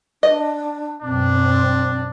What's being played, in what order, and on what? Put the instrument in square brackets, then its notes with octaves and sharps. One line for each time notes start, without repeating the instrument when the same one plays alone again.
[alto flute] D4 [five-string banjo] D#5
[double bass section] F#2 B2 [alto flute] C4 [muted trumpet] D4